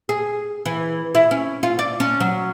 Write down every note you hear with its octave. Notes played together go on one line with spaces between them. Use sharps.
G#4
E3
E4
C#4
F4
D5
C#4
F#3